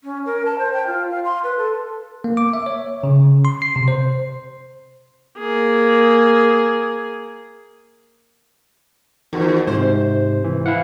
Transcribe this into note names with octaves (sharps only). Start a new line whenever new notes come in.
C#4
A#4
A5
C5
G5
F4
F5
C6
B4
A4
A#3
D6
E5
C#5
C#3
C6
C7
C3
C5
A#3 G#4
E2 D#3 F#4
G#2 C3 C5
E3
E4 F5 F#5